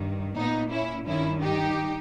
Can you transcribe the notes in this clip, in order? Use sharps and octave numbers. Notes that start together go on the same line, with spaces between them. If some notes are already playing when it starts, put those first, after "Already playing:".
Already playing: G2 D#3
A#2 B3 D#4
C#4 E4
G2 D#3 C#4 E4
D#4 G4